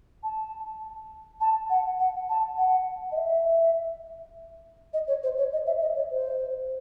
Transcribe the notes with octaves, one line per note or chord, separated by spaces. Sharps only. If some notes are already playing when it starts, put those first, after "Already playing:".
A5
A5
F#5
F#5
A5
F#5
D#5
E5
D#5
C#5
C5
C#5
D#5
E5
D#5
C#5
C5